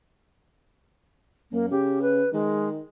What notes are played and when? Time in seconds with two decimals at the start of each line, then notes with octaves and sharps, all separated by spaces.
1.52 F#2 A#3
1.71 C#3 G4
2.02 B4
2.33 D#3 G#3